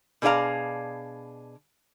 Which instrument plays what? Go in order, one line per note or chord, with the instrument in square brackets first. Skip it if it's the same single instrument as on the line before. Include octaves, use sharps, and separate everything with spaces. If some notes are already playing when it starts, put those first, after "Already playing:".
[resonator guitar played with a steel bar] B2 D4 G#4 D5 F5 A#5